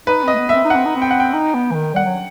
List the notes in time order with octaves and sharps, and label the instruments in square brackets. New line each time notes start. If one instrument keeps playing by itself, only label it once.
[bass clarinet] D#4 [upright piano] B4
[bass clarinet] C4 [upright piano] D#5
[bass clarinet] A3
B3
[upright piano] E5
[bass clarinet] C4
D#4
[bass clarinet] C4 [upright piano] F#5
[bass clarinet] D#4
C4
[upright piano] G5
F#5
G5
[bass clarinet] D#4
B3
E3
D#3
[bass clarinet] G3 [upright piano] F#5
[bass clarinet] F#3